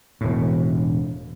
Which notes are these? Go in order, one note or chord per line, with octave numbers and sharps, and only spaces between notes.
E1 A2